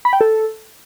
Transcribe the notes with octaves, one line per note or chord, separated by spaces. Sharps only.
B5
G5
A4